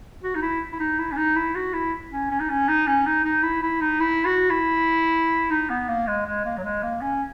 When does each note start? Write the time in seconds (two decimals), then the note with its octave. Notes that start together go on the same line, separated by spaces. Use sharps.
0.23 F#4
0.35 D#4
0.42 E4
0.73 E4
0.80 D#4
0.99 E4
1.12 C#4
1.17 D#4
1.36 E4
1.55 F#4
1.74 E4
2.12 C#4
2.31 C#4
2.40 D#4
2.49 C#4
2.68 D#4
2.87 C#4
3.06 D#4
3.25 D#4
3.43 E4
3.62 E4
3.81 D#4
4.00 E4
4.25 F#4
4.50 E4
5.51 D#4
5.70 B3
5.89 A#3
6.07 G#3
6.27 G#3
6.45 A#3
6.57 F#3
6.63 G#3
6.83 A#3
7.02 C#4